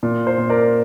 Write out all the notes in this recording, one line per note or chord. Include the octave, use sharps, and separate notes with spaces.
A#2
C5
A#2
A#4 D5